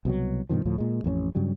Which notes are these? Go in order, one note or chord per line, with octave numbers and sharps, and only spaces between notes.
C2 B2 F3 F#3
G2 B2 D#3 F3
D2 A2 F3
A#2 G#3
A1 F2 B3 C#4
G2 C#3 F#3 G3